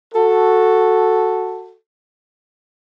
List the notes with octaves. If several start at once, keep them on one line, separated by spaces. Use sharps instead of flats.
F#4 A4